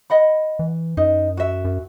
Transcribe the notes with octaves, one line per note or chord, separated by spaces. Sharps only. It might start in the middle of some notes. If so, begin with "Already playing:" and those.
D#5 F#5 B5
E3
F#2 D#4
F#4 E5
F#2